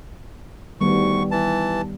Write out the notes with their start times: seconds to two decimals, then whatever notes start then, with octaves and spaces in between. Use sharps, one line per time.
0.81 D2 D#3 G3 B3 C#6
1.31 E3 A5